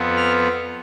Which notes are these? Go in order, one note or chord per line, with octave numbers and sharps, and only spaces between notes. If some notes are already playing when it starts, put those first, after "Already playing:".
Already playing: F2 F3 B3
F6